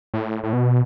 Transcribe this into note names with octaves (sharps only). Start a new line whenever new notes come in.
A2
A2
B2